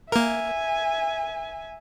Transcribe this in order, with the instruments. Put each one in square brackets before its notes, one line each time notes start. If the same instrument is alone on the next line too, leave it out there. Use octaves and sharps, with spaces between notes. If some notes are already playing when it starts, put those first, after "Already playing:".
[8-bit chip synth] A#3 A#4 [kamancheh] E5 G#5